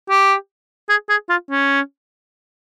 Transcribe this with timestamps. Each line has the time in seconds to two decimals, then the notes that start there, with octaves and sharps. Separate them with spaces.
0.10 G4
0.89 G#4
1.10 G#4
1.29 F4
1.50 C#4